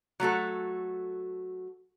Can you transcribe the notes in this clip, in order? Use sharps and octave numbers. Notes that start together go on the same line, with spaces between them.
F#3 A3 F#4 A4